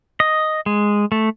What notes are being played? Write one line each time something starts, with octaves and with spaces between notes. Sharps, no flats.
D#5
G#3
A3